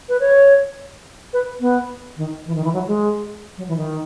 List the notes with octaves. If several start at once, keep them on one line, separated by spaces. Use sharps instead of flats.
B4
C#5
B4
B3
D#3
E3
D#3
E3
F#3
G#3
F#3
E3
D#3